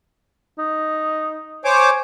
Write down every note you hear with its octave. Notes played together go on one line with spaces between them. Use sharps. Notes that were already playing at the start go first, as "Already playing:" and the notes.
D#4
C5 C#5 G#5 D6